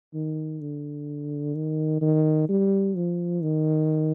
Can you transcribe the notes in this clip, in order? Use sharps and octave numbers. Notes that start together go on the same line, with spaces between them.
D#3
D3
D#3
D#3
G3
F3
D#3